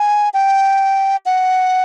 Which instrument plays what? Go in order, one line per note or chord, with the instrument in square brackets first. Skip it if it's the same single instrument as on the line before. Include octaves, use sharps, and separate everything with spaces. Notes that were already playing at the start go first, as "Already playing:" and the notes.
Already playing: [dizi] G#5
G5
F#5